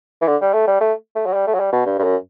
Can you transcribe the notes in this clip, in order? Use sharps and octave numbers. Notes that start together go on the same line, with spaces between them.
E3
D3
G3
A3
G3
A3
A3
F#3
G3
A3
F#3
G3
B2
G2
G2
F#2